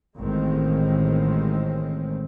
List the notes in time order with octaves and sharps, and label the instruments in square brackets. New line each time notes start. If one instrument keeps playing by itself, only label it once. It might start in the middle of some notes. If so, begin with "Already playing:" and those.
[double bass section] A1 D#3 G#3 C4